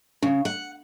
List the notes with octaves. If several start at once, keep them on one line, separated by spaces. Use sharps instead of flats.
C#3
F#5